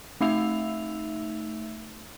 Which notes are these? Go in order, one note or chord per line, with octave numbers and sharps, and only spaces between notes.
A3 D#4 E5 E6 F7